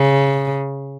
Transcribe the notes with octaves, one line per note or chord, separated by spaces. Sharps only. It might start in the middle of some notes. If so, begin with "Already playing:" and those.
Already playing: C#3